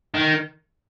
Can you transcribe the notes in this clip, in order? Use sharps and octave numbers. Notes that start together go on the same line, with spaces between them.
D#3